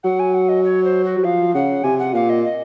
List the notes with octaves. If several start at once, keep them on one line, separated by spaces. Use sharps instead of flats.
F#3 F#5
G#5
F#5
D#5
C#5
C5
F#4
F#3
F3 F5
C#3 F#5
C3 G#5
F#5
A#2 F5
D#5
D#5